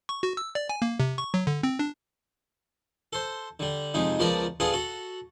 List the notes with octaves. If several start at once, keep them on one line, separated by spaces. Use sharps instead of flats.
C#6
F#4
E6
D5
G#5
A#3
C3
C#6
F#3
D3
C4
D4
A4 C5
D3 G3
F2 C3 G#3 D#4
C#2 F3 B3 A#4 D5 A5
B3 D4 F4 G#4 A4
F#4 A4